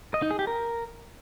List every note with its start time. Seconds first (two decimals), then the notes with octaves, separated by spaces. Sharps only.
0.14 D#5
0.22 D#4
0.31 G#4
0.39 G4
0.47 A#4